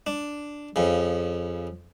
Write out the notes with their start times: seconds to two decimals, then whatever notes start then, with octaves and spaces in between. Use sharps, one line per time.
0.07 D4
0.76 F2 C#3